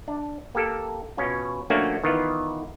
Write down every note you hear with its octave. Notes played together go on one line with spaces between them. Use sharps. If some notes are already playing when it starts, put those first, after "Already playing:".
D4
A#3 G4 A4
B2 C#4 F4
F3 A3 A#3 C#4 D4 F#4
D#3 E3 B3 F4